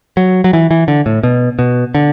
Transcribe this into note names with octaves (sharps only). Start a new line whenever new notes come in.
F#3
F#3
E3
E3
D3
A2
B2
B2
D3